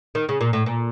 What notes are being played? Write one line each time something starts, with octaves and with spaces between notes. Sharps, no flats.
D#3
C#3
A#2
A2
A#2